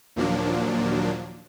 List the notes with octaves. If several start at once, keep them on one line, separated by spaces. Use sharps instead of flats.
D#2 A#2 F3 F#3 A#3 D4